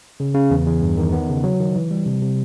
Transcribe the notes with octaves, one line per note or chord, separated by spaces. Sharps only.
C#3
C#3
E2
E2
G2
D#3
B3
C#3
F#3
D#3
E3
G3
C3
C3